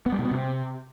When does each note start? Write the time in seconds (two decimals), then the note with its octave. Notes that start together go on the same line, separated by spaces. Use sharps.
0.06 B3
0.12 G3
0.19 B2
0.25 B3
0.31 C3